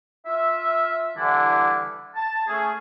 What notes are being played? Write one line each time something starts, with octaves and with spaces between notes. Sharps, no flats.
F4 E5
D3 E3 G3 D4 E4
A5
A3 C#4 G#4